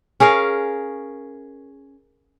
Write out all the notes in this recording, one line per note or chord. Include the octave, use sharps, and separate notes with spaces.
C#4 G#4 A#4 F5